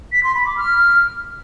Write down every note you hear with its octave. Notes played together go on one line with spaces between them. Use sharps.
B6
C6
B5
D6
F6